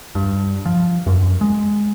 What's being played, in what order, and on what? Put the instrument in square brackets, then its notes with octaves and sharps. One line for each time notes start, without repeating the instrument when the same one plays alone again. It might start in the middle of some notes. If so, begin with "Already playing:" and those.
[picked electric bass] G2
F3
F#2
G#3